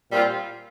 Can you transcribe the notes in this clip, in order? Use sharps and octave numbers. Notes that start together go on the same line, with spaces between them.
A#2 G3 C4 F4